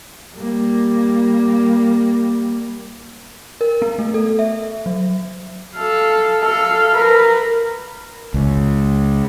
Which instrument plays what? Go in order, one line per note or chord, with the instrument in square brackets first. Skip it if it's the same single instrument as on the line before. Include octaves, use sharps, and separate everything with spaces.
[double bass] G3 A#3
[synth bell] A#4
B3
A3
A4
E5
F#3
[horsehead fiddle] A4 F5
A4 F5
A#4 B4
[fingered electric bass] C#2